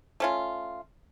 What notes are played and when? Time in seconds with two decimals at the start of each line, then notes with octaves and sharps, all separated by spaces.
0.20 A3 C#4 F4